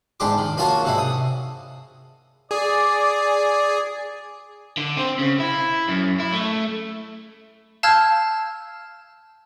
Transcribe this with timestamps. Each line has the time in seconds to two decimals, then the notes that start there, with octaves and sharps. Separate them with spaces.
0.20 E2 G#2 D4 G4 C6 D6
0.38 D#3
0.57 A#3 F4 F#4 C#5 F5 A5
0.85 G#2 C3 D4 E4
0.98 D#6
2.51 G#4 D5
4.78 D3
4.97 C4
5.19 C#3
5.39 E4
5.88 F#2
6.20 E4
6.33 A3
7.83 F5 A5 E6 F6 G6 G#6